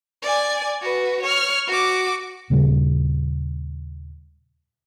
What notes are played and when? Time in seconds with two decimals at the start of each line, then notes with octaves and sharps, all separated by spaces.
0.23 D5 G#5
0.82 F#4 B4
1.23 C#5 F6
1.67 F#4 D6
2.50 D#2 A#2 C#3 G3